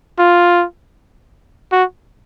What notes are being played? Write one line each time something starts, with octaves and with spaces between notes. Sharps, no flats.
F4
F#4